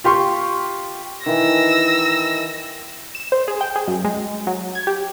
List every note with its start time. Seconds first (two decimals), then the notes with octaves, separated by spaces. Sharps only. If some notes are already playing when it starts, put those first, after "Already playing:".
0.04 F4 G4 C6 C#6
1.26 D#3 E3 E6 A#6
3.15 E7
3.32 C5
3.48 G#4
3.61 G5
3.76 G#4
3.87 F#2
4.04 G#3
4.47 F#3
4.75 G#6
4.87 G4